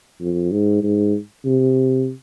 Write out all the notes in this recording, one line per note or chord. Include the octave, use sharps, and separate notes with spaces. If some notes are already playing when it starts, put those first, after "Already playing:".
F2
G#2
G#2
C3